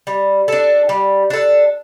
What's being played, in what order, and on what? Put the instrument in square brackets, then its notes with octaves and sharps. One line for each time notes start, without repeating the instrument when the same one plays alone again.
[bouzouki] G3
D4 A4
G3
D4 A4